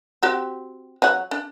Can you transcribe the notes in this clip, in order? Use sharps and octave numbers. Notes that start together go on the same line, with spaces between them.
C4 F#4 G4
F#3 C#5 F#5
D4